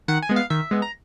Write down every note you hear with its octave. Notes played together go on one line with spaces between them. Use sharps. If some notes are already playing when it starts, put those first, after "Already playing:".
D#3 F#5
G#5
G#3 B3
F5
D#3 E5
G#3 B3
A#5